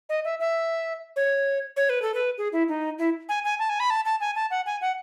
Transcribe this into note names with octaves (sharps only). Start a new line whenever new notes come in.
D#5
E5
E5
C#5
C#5
B4
A4
B4
G#4
E4
D#4
E4
G#5
G#5
A5
G#5
B5
A5
A5
G#5
A5
F#5
G#5
F#5